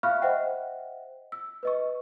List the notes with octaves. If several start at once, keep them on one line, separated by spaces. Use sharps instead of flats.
E5 F5 B5 C#6 F6 F#6
C5 D#5 E5 F#5 G5
E6
B4 D#5 C#6